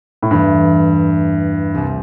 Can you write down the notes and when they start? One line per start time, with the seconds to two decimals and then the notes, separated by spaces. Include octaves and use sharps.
0.22 A2
0.31 E2 G2 E3 A3 E4
1.75 C2 C3 G3